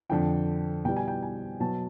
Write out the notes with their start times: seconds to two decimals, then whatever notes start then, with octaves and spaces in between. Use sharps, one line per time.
0.09 F2 D3 F3 G5
0.85 B2 G3 G5
0.97 G#5
1.08 G5
1.23 G#5
1.60 B2 F#3 A5